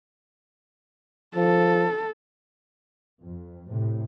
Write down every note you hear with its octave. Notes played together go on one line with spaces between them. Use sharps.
F3 A4
F2
A2 C3